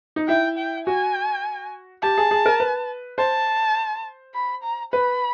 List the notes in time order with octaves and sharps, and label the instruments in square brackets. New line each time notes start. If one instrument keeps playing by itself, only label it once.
[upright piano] D#4
[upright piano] E4 [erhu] G5
[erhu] G5
[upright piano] F#4 [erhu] G#5
[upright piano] G4 [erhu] A5
[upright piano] G#4
G#4
A#4
B4
[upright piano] C5 [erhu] A5
[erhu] B5
A#5
[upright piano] B4 [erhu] B5